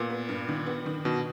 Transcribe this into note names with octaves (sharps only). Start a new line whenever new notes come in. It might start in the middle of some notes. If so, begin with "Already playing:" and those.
Already playing: A#2 B3
B3
G2
D#3
B3
D#3
B2 D#3